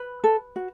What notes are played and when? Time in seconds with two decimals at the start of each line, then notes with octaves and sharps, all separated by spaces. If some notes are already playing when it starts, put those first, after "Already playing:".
Already playing: B4
0.24 A4
0.56 F#4